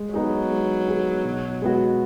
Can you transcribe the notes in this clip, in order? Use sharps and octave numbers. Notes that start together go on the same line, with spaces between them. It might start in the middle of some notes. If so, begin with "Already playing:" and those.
Already playing: G#3
F#3 B3 D#4 G#4
G#3
B3 D#4 G#4
B2
G#3 B3 F#4